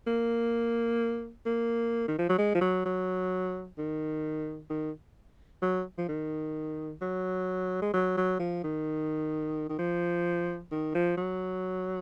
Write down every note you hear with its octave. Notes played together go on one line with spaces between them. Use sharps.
A#3
A#3
D#3
F3
F#3
G#3
F3
F#3
F#3
D#3
D#3
F#3
F3
D#3
F#3
G#3
F#3
F#3
F3
D#3
D#3
F3
D#3
F3
F#3